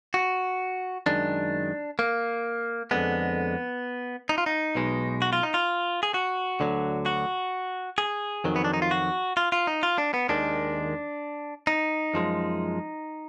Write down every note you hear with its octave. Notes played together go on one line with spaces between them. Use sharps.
F#4
F#2 D#3 G#3 D4
A#3
F2 D3 G#3 B3
D#4
F4
D#4
B1 B2 G#3
F#4
F4
D#4
F4
G#4
F#4
D2 D3 F#3
F#4
G#4
F2 D#3 F#3
B3
D4
D#4
F4
F#4
F4
F4
D#4
F4
D4
B3
D#2 D#3 G#3 D4
D#4
F#2 F3 G#3